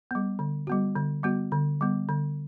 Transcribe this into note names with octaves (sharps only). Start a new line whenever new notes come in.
G3 B3
D3
G3 B3 F#4
D3
G3 B3 F#4
D3
G3 B3
D3